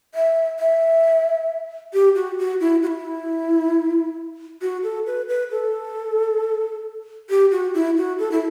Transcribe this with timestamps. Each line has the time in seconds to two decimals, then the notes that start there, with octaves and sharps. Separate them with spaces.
0.15 E5
0.59 E5
1.93 G4
2.16 F#4
2.39 F#4
2.60 E4
2.83 F#4
2.87 E4
4.62 F#4
4.84 A4
5.06 B4
5.28 B4
5.51 A4
7.30 G4
7.52 F#4
7.75 E4
7.97 F#4
8.19 A4
8.32 E4